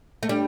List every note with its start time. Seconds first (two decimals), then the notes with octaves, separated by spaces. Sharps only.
0.23 A3
0.29 G3 D4